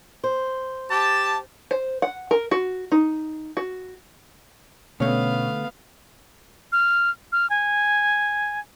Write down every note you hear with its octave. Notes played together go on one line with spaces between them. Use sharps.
C5
G4 A5
C5
F#5
A#4
F#4
D#4
F#4
D2 B2 A3 B3 C#4 C#5 F5
F6
F6
G#5